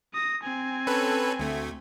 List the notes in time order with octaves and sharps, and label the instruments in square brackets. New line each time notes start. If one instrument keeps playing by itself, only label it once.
[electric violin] D#6 A#6
C4 G#5
[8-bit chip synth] C#4 A4 B4
D2 A3